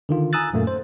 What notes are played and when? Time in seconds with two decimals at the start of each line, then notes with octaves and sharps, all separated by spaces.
0.09 D3 D#3 F4
0.33 G#5 A#5 D#6 E6 F#6 A6
0.54 F#2 A#2 A3 A#3
0.67 C5